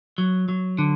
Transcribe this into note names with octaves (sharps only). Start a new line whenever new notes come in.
F#3
F#3
D3